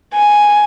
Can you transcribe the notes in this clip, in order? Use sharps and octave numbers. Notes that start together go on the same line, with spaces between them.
G#5